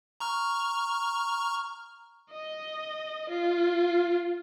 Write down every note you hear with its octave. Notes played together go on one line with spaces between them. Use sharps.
A#5 C#6 F6
D#5
F4